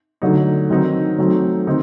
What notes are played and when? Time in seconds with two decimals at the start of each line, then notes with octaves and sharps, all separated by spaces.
0.22 D3 F#3 A3 D#4
0.70 D#3 F#3 C4 D#4
1.18 F#3 A3 C4 D#4
1.67 D#3 C4 D#4